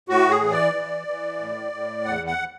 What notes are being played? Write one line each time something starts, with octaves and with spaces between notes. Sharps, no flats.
A2 F#4
G#4
E3
D5
E3
E3
A2
A2
E2 F#5
F#5